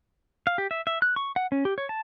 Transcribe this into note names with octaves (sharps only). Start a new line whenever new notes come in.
F5
G4
E5
E5
F#6
C#6
F#5
C#4
G4
C#5
A5